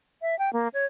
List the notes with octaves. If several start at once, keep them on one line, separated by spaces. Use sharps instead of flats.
E5
G5
A#3
C#5